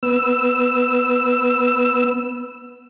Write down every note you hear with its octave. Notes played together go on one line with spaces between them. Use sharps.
B3 E6